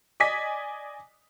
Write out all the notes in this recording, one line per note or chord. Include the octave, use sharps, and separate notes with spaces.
D5 D#5 G#5 B6